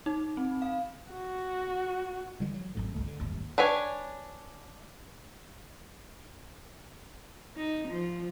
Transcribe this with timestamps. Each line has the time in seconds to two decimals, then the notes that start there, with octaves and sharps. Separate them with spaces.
0.06 D#4
0.37 C4
0.62 F5
1.11 F#4
2.40 D3 E3 G3 G#3
2.54 F#3
2.75 G#1 F#2 A2
2.95 G1 C#2 A3
3.07 D3
3.19 D1 G1 D#2
3.58 D4 B4 C#5 G#5
7.56 D#4
7.88 F3